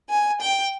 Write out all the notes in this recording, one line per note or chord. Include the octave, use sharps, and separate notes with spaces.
G#5
G5